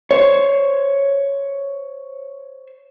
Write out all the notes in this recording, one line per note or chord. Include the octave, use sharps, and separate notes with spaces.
C5 C#5